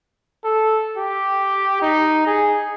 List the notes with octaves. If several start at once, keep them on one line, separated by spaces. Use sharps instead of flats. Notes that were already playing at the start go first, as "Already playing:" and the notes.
A4
G4
D#4
G#4